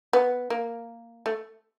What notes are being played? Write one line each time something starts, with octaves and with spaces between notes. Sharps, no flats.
B3
A#3
A3